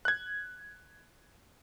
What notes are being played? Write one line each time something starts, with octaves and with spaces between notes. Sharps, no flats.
F#6 G#6